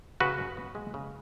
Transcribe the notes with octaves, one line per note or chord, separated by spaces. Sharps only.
C#3 F#4 B4
F#2
B3
G#3
C#3